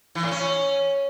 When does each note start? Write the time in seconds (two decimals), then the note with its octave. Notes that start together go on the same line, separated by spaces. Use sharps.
0.15 E3
0.23 A2
0.31 C#4